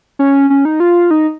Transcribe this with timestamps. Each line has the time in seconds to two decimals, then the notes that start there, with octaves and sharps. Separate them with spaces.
0.19 C#4
0.50 C#4
0.65 D#4
0.80 F4
1.11 D#4